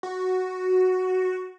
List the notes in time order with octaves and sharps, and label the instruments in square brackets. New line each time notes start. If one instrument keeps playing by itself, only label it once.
[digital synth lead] F#4